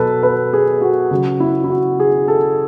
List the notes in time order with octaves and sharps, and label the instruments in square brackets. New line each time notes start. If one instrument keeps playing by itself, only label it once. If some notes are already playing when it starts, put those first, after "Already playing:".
Already playing: [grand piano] B2 F#3 A4 B4
B4
G#4
F#4
C#3 F#3 F#4
E4
E4
F#4
G#4
A4